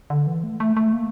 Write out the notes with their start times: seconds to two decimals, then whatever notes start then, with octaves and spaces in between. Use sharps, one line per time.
0.10 D3
0.27 E3
0.44 A3
0.60 A3
0.77 A3
0.93 A#3